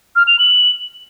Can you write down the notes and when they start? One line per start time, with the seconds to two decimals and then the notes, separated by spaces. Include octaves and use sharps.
0.16 F6
0.27 F7
0.39 F#7